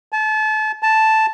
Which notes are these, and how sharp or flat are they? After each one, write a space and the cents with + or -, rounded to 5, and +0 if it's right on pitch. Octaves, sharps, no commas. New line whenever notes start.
A5 -30
A5 +0